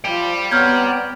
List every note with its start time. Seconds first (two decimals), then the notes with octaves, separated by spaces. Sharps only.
0.05 F3 D5 G5
0.51 B3 C4 C#5 A#5 F6 G6 G#6